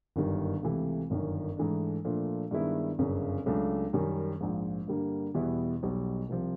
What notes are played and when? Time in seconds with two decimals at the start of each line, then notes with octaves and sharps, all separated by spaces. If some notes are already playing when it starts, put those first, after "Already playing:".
0.16 G1 F#2 D#3 G3
0.63 C#2 C3 E3 A3
1.10 G1 F#2 D#3
1.57 G#2 E3 A3 D4
2.05 A#2 F3 A3 D4
2.51 G2 D#3 G#3 B3 E4
2.98 G1 F#2 C#3
3.46 C#2 C#3 F#3 A3 D4
3.93 F#2 D#3 G3
4.41 A#1 G#2 F3
4.88 G2 D3 G3 A#3
5.34 E2 B2 G3 B3 E4
5.83 B1 B2 G3
6.29 C2 C3 F3